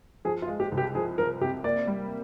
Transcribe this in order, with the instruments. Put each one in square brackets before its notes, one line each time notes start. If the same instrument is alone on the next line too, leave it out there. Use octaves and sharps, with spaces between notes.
[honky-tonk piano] F3 [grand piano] G#4
[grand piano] F4
[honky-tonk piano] G#3
[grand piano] G4
[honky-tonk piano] C2
[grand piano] G4
[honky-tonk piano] F3 [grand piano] G#4
[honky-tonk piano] F3 [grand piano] A#4
[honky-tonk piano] C3 [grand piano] G4
[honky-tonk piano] A#3 [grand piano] D5
[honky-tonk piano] G3